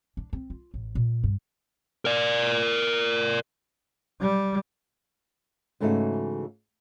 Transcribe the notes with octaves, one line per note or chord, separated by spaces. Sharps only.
D4
C4
F4
A1
A#2
G2
A#4 D5
G3
G#2 C#3 E3 A3 D#4 F#4